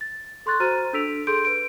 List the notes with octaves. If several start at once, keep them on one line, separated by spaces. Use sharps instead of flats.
A6
A4 C6 C#6 F#6 A6
F#4 C5 A#5 F6 A6 D#7
D4 A4 E6 B6 D7 F7
G#4 A4 C6 G6 D7
B4 D7